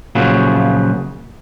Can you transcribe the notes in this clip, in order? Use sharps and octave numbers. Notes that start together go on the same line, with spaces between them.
A#2 C#3 F3 F#3